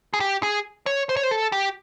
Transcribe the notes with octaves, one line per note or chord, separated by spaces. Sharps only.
G#4
G4
G#4
C#5
C5
C#5
C5
A4
G4